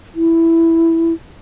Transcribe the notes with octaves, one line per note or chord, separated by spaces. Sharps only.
E4